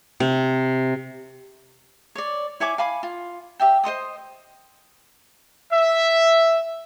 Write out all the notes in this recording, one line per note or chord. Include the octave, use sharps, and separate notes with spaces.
C3
C#5 D5
E4 C#5 G#5 D6
F5 G#5 B5 D6
F4
G4 E5 G5
C5 D#5 C6 D#6
E5